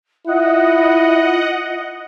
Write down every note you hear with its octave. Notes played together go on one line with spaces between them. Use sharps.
E4 F4 D#5 F#5